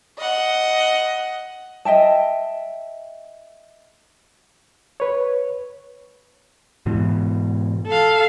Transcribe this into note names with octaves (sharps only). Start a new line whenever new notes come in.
D#5 F#5
D#5 E5 G5 A5
B4 C#5
G#2 B2 E3
A4 F5